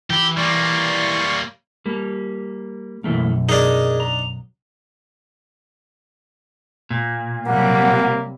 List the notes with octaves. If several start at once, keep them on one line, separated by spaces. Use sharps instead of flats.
E3 G4 B5
G3 A#3 D5 C6 C#6
G3 A#3
B1 F#2 E3 A3 A#3
D4 D#4 G#4 A#4 D#5
A#5
A#2
C3 F#3 G3 A#3 F#5